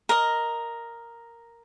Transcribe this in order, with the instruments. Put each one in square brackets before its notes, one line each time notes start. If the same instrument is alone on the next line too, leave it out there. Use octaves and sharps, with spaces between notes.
[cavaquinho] A#4 D#5